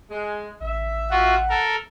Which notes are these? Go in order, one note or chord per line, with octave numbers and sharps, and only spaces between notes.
G#3
A1 E5
F4 F#4 F#5
A4 A#4